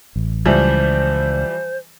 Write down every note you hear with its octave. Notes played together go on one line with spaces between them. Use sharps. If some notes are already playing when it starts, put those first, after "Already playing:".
A1
C#2 E3 F3 G3 C5